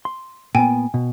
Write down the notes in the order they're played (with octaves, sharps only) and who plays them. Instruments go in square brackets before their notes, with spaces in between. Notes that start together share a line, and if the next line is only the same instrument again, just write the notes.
[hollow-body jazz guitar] C6
[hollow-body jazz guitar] A#2 B3 [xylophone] G5 G#5
[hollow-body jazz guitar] B2